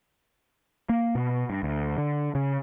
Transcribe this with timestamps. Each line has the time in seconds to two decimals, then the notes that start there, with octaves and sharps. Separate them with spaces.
0.89 A#3
1.15 B2
1.50 G2
1.63 D2
1.98 D3
2.35 C#3